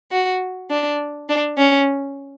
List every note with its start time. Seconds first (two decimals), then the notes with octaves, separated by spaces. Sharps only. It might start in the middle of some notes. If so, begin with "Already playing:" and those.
0.11 F#4
0.70 D4
1.29 D4
1.58 C#4